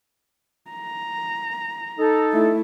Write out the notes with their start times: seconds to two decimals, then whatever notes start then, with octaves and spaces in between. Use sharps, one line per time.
0.71 A#5
1.99 D#4 A4
2.33 A3 E4